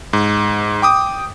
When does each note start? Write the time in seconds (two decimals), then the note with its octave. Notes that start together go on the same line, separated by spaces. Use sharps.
0.13 G#2
0.82 G5 D6 D#6